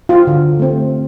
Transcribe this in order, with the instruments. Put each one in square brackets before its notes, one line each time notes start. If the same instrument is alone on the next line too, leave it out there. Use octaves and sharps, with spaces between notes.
[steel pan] F4
D3
A3 C4